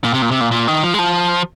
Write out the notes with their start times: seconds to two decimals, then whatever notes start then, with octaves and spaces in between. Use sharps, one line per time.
0.04 A#2
0.14 C3
0.22 A#2
0.31 C3
0.41 A#2
0.51 A#2
0.68 D#3
0.83 F3
0.94 G#3
0.99 F3